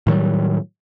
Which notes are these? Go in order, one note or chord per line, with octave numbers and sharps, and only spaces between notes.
A2 D#3 F#3 G3